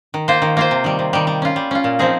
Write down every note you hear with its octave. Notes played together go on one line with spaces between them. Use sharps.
D#3
A#3 F4 C5
D#3
A#3 F4 C5
C3
D#3 G3
C3
D#3 G3
G3
C#4 F4
G3
C#4 F4
A#2
F3 C4 D#4 G#4